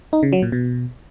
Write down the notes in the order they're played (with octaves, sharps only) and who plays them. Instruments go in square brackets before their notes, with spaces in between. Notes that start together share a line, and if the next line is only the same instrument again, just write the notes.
[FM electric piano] D#4
C#3
F#3
A#2
B2